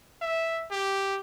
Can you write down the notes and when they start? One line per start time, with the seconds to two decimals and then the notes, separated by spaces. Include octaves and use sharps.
0.22 E5
0.71 G4